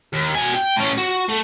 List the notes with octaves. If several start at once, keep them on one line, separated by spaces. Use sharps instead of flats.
D#2
B2 G#5
G5
A2 C#4
F#4
A3